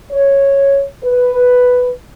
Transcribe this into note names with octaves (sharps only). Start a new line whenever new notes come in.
C#5
B4